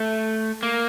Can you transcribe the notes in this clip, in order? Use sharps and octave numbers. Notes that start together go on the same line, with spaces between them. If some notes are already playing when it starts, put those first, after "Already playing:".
Already playing: A3
A#3